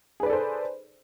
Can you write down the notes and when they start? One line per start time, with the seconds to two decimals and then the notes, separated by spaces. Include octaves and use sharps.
0.20 G#4
0.23 B4
0.26 D5
0.30 A4
0.33 C5